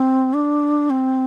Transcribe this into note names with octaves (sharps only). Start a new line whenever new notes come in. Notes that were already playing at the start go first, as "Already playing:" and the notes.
Already playing: C4
D4
C4